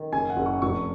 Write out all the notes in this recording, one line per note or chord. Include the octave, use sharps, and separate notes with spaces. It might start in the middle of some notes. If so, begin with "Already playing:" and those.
Already playing: D#3
F#1 G#5
F#5
F#1
C#6
F1 C#6